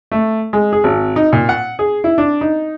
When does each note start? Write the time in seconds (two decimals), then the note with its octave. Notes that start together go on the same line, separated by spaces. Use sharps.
0.11 A3
0.53 G#3
0.73 G#4
0.84 G#1
1.16 D#4
1.33 A#2
1.49 F#5
1.79 G#4
2.04 E4
2.18 D4
2.41 D#4